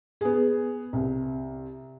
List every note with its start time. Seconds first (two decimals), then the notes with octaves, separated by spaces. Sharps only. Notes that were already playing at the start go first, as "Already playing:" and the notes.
0.21 B3 G#4
0.93 C2